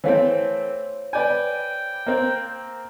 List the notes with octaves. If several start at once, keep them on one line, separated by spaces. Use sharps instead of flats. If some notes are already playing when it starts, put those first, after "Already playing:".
E3 A3 C4 C5 C#5 F5
B4 D5 G5 G#5
A#3 C4